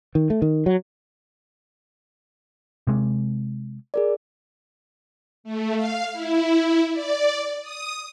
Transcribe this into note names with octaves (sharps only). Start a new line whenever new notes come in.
D#3
A3
D#3
F#3
C3 G#3
G#4 A#4 D5
A3
F5
E4
D5
D#6